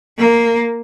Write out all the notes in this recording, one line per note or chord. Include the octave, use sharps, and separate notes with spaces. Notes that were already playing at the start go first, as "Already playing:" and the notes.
A#3